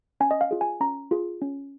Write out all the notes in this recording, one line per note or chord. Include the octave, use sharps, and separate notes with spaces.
C#4 G#5
D#5
F5
F4 G#4
G#5
C#4 A#5
F4 G#4
C#4